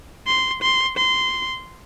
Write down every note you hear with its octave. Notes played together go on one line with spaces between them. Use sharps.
C6
C6
C6